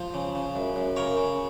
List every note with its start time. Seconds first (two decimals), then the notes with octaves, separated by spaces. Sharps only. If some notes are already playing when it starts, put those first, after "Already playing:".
Already playing: F3
0.14 C#3
0.35 C#3
0.56 F#2
0.76 F#2
0.96 C#3 A#4 C#5
1.17 C#3